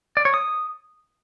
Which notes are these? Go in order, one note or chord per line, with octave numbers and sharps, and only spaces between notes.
D5
C#5
D#6